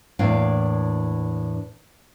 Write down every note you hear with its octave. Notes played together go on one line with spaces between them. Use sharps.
E2 A2 A#3 D4 F5